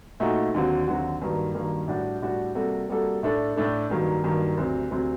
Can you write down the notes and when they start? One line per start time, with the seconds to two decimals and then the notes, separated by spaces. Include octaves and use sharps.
0.20 A#2 A3 D#4 F#4
0.54 D#2 D3 F#3 C4 F#4
0.87 D#2 D3 F#3 C4 F#4
1.21 G2 D#3 F#3 A#3
1.54 G2 D#3 F#3 A#3
1.88 A2 G3 D4 F#4
2.22 A2 G3 D4 F#4
2.55 C3 G3 A#3 F#4 A4
2.89 C3 G3 A#3 F#4 A4
3.23 A2 A3 D4 A4
3.56 A2 A3 D4 A4
3.90 G2 D#3 F#3 A#3
4.24 G2 D#3 F#3 A#3
4.57 D2 C3 F#3 C4
4.91 D2 C3 F#3 C4